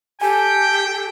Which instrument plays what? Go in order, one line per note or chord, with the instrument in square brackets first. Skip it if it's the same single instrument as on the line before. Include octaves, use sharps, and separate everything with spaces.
[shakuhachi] G4 [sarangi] A4 [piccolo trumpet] G5 [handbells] G#5